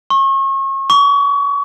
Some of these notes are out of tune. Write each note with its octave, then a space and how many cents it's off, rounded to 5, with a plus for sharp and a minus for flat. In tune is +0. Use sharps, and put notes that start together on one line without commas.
C#6 -35
C#6 +35